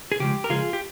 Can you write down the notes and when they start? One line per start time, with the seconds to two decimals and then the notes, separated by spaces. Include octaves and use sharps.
0.12 G#4
0.20 C#3 F3 G#3 G4
0.44 A#4
0.49 C#3 F3 G#3 F4 G#4
0.73 G4